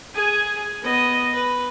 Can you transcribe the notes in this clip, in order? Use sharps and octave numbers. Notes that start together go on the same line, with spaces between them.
G#4 G#5
B3 D#5
B4